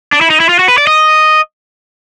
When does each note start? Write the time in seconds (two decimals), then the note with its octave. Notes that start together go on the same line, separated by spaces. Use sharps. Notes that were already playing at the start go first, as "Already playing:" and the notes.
0.12 D4
0.21 E4
0.30 D#4
0.40 E4
0.49 F4
0.59 F#4
0.68 B4
0.78 D5
0.87 D#5